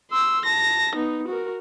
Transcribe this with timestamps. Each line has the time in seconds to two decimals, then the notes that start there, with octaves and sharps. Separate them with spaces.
0.11 C6 E6
0.45 A5 A#6
0.96 B3 D#4
1.28 F#4 A#4